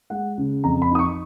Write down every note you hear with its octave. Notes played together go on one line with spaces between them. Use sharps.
G#3 F#5
C#3
F2 A#5
B5
D#4 D#6
C#6